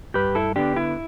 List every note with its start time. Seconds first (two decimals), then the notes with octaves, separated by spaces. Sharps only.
0.14 G2 G4 B4
0.35 E4 A4
0.56 D3 B3 D4 G4
0.76 E4